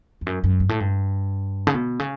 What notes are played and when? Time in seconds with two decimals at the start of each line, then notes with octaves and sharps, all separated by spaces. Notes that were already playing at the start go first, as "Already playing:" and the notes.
0.21 E2
0.26 F#2
0.44 F#2
0.60 G2
0.69 A2
0.80 G2
1.67 C#3
1.74 B2
1.99 C#3